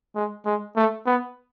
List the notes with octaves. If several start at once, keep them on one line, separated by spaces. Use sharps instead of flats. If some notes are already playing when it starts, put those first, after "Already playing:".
G#3
G#3
A3
B3